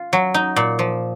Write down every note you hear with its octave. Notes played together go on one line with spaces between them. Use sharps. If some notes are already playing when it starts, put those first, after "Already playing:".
Already playing: F4
F#3
D#4
A#2
F3